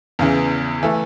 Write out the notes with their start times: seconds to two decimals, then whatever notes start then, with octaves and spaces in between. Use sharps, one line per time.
0.19 E2 C#3 E3
0.83 E3 A3